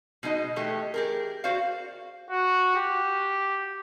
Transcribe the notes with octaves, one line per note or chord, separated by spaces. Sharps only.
B2 G#3 D#4 D#5
E3 G#3 A3 G4
G4 G#4 A#4
F#4 C5 D5 F5
F#4
G4